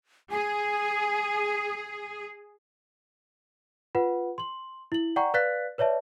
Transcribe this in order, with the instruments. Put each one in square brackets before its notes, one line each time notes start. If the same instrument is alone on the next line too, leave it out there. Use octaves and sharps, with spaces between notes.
[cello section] G#4 [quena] G#5
[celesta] F4 B4 F#5
C6 F#7
E4 F#7
D5 F#5 G5 A#5 C#6
B4 D5 F5 F#6 A6 B6
B4 C#5 D5 E5 A5